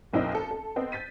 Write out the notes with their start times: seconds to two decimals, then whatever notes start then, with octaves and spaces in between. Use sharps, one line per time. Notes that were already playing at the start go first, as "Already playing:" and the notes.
0.13 F#1 B1 C4 E4 D#5
0.35 A4
0.51 A4
0.76 B3 C4 D#5
0.92 G6 A6 B6 D#7